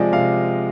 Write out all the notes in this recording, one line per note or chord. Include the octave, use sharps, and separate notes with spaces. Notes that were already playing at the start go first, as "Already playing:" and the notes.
Already playing: C3 F3 G#3 D5 D#5
C3 F5